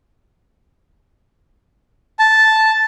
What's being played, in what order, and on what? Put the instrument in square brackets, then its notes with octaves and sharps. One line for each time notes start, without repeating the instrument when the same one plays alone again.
[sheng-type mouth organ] A5